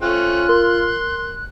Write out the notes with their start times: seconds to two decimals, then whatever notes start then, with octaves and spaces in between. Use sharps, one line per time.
0.02 A3 C4 C#4 F4 F#6
0.49 A#4 C6